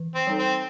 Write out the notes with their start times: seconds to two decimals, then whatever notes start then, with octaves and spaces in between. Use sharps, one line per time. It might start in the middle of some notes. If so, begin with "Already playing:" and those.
Already playing: E3
0.15 C4
0.27 G3 D#4 A4
0.39 C4